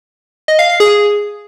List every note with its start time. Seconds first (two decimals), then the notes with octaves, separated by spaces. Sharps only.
0.48 D#5
0.59 F5
0.69 F5
0.80 G#4